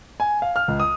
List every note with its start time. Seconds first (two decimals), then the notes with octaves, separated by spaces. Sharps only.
0.20 G#5
0.42 F5
0.56 F6
0.68 C#2
0.80 D#6